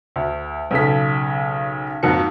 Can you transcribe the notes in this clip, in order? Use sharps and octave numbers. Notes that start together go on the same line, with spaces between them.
D2
B1 C#3 A4 B6
F2 G#2 A#3 F4 F#4 C#7